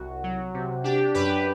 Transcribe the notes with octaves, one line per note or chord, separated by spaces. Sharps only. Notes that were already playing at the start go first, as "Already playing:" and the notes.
Already playing: C2 F#4
F#3
C3
D4 G4
F#2 G4 B4